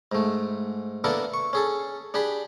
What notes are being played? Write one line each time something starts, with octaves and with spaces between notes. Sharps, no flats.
G#2 A3
A#3 B3 D4 E4 A4 A#4
C#6
C#4 G#4 A4
D4 G4 G#4 B5